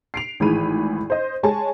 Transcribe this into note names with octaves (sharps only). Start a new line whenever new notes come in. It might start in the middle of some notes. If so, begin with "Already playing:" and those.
C7 D7 F7
G#1 A2 E3 G#4 B5 D#7
C5 D#5
G#3 C#5 G#5 A5